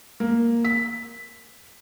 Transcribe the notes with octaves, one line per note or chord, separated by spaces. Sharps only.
A#3
B6